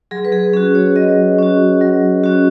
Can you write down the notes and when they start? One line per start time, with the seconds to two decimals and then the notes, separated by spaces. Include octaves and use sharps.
0.11 F#3 G#4
0.25 B4
0.32 G#4
0.53 C#4 F#4 G#4
0.75 C#5
0.96 F#3 D#5
1.38 C#4 F#4
1.81 F#3
2.23 C#4 F#4